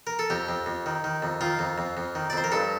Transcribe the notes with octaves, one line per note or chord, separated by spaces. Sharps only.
A#4
A4
F2 G4
F2
F2
D#3
D#3
F2
D#3 F4
F2
F2
F2
D#3
D5
F2 C5
A#4
G2 A4